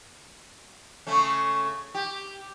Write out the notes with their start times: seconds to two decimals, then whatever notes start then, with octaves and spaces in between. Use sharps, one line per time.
1.07 C#3 A3 C#4
1.94 G4